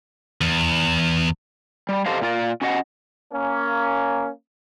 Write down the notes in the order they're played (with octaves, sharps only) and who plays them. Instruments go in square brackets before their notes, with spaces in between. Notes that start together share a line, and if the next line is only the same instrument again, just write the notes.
[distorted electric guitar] E2
[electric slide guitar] G3
G4 A4 C5 D#5 F5
A#2 F4 D5
C#4 F#4 D#5 F#5
[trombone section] A#3 C#4